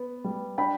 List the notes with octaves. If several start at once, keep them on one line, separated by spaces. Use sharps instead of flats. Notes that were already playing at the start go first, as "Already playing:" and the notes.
Already playing: B3
G3
D4 G5 B5